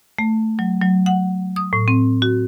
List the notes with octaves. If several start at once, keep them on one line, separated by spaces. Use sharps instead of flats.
A3
F#3
F#3
F#5
D#6
A2
C4
F#4